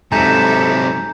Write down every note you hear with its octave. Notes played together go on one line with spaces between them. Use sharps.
G#2 C3 F#3 A4 E5 G#5 A#5 G6